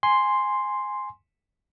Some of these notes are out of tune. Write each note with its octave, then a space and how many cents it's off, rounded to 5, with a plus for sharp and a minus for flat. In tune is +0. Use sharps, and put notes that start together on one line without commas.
G#5 +0 C6 +0